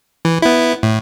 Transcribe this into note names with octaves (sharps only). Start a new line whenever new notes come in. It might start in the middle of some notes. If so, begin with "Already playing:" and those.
E3
B3 E4
A2